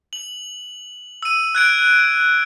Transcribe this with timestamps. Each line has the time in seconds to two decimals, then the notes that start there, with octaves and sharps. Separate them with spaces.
0.13 F#7
1.23 E6 D#7
1.55 F#6 G#6 D7